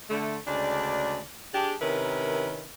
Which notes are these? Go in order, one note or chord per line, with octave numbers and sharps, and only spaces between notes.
D3 A3
D2 C#3 G#3 D4 D5
D4 G4 G#4
C3 D#3 C#4 E4 A#4 B4